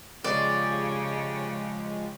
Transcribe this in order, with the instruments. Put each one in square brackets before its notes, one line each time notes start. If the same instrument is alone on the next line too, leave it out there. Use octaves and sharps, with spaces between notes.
[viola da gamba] C#3 [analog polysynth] F3 G#3 G4 [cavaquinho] D5